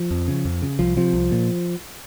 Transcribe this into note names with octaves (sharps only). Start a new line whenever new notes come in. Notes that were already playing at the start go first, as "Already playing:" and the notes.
Already playing: F3
F2
C#3
F2
C#3
C2 F3
C3 F3
C2
A#2